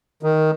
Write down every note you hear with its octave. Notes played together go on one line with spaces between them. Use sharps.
D#3